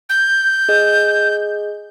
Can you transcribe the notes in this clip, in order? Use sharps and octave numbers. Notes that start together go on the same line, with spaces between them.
G6
G#4 D#5